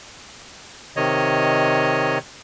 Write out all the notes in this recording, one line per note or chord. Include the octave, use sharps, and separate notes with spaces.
C3 D#3 C#5 D#5